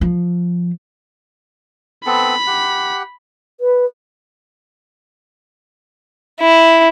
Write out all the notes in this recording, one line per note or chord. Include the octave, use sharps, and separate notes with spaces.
F3
B3 C4 A4 B5
G4 F#5
B4
E4